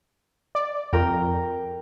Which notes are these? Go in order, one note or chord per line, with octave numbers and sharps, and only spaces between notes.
D5
F2 A#4 G5